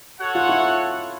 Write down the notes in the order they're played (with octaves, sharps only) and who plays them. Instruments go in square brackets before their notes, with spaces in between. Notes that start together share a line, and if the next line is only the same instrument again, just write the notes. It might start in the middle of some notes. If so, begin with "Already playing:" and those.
[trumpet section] F#4 A4 C#5 F#5
[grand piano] F4
E4